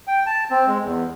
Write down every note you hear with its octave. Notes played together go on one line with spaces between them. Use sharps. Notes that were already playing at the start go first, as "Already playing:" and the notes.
G5
A5
C4
G#3
E2